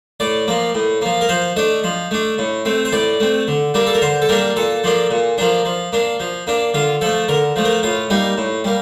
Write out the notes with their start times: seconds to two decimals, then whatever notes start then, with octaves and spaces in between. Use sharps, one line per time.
0.20 A2 D5
0.48 F3 A#3
0.75 A2
1.01 F3 A#3
1.21 A#4
1.29 F3 C5
1.56 A3 D4 D#5
1.84 F3
2.11 A3 D4
2.38 A2
2.65 A3 C4
2.85 C5
2.92 A2 D5
3.20 A3 C4
3.48 D3
3.74 G3 A#3 D4
3.87 A4
3.94 A#4
4.02 D3 C5
4.22 A4
4.29 G3 A#3 D4 A#4
4.56 A#2 A4
4.84 F3 A#3 D4
5.11 A#2
5.38 F3 A#3 D4
5.65 F3
5.92 A#3 D4
6.20 F3
6.47 A#3 D4
6.74 D3 F4
7.01 F3 A3 A4
7.28 D3 A#4
7.56 F3 A3
7.65 A#4
7.83 A2 F4
8.10 G3 A#3 D#4
8.38 A2
8.64 G3 A#3